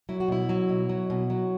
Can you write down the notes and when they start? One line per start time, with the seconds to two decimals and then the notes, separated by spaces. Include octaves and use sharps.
0.09 F#3 E4
0.20 F#4
0.28 B2 E4
0.49 F#3
0.69 B2
0.89 F#3
1.10 B2
1.30 F#3